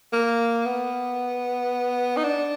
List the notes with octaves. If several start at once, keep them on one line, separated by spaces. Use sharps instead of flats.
A#3
B3
D#4
D4